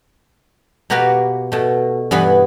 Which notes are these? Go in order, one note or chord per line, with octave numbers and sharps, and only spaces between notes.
B2 A#3 F#4 G4 B4 G#5
B2 A3
G2 E3 B3 G#5 B5